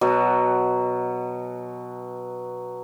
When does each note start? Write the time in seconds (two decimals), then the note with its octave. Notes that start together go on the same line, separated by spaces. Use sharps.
0.01 B2 F#3